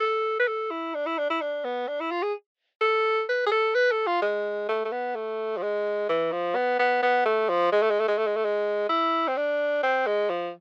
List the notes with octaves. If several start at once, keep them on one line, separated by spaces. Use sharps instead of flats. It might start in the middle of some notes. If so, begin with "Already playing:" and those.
A4
B4
A4
E4
D4
E4
D4
E4
D4
B3
D4
E4
F4
G#4
A4
B4
G#4
A4
B4
A4
F4
G#3
A3
A3
B3
A3
F3
G#3
E3
F3
B3
B3
B3
A3
F3
G#3
A3
G#3
A3
G#3
A3
G#3
A3
G#3
E4
C4
D4
C4
G#3
F3